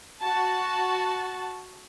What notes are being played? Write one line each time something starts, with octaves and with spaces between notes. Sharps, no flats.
F#4 A5